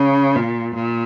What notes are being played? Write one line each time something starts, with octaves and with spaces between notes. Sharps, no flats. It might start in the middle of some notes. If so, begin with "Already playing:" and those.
Already playing: C#3
A#2
A#2